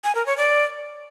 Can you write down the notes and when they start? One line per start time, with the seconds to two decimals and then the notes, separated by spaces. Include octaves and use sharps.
0.04 G#5
0.15 A#4
0.26 C#5
0.37 D5